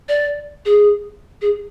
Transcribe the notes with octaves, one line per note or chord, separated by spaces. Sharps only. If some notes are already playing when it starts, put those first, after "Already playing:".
D5
G#4
G#4